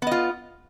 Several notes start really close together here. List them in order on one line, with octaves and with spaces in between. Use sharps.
B3 D#5 F4